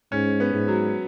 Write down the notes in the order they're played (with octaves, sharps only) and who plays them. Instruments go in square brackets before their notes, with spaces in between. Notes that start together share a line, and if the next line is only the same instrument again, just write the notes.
[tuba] G#2 [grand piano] C#4
[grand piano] B3
[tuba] G#2
[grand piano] F#3